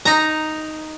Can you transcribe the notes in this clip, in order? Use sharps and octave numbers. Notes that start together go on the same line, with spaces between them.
D#4 A#5